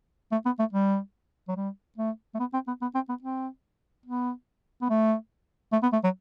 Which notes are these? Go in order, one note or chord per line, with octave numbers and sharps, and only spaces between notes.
A3
B3
A3
G3
F#3
G3
A3
A3
B3
C4
B3
B3
C4
B3
C4
B3
B3
A3
A3
B3
A3
F#3